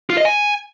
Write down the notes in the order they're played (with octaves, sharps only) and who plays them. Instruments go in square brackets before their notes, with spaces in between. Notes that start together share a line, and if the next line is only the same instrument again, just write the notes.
[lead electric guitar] F4
D#5
G#5